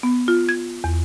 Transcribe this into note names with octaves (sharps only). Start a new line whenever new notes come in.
B3
F4
G#6
E2